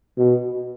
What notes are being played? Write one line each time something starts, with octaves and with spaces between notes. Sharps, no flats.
B2